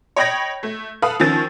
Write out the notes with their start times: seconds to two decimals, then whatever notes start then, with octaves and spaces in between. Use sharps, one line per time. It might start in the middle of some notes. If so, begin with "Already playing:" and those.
0.16 C#5 D#5 G5 B5 G#6 A#6
0.63 A3
1.02 A4 B4 F5 B5 D#6
1.20 D#3 F3 C#4 E6 A6